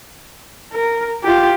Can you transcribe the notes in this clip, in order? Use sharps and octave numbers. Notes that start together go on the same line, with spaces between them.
A#4
F4 G4